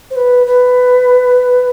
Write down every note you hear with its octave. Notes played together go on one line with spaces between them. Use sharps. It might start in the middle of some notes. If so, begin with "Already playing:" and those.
C5
B4
B4